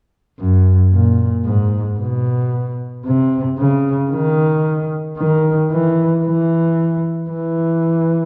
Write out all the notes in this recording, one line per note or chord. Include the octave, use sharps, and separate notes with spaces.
F#2
A#2
G#2
B2
C3
C#3
D#3
D#3
E3
E3
E3